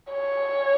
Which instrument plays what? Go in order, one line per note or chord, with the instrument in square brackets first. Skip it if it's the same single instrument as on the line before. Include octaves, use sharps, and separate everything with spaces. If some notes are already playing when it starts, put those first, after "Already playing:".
[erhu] C#5